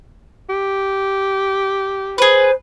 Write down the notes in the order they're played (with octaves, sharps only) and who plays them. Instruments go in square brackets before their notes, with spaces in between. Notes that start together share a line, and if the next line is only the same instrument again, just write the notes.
[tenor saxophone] G4
[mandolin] G#4 B4 [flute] C5